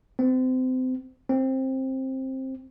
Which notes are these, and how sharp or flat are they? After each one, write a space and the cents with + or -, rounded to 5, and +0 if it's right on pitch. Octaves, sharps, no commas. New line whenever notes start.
C4 -30
C4 +15